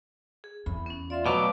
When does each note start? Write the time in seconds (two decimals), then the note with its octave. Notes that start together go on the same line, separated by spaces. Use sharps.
0.44 G#4
0.66 E2 B5
0.86 B3 C#4
1.10 F4 D5 E5 C6
1.26 B2 F#3 A3 B4 F5 D6